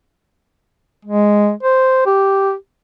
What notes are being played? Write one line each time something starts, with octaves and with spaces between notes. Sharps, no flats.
G#3
C5
G4